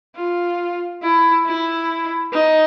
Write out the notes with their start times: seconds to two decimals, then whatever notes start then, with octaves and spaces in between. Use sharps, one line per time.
0.15 F4
1.02 E4
1.45 E4
2.32 D#4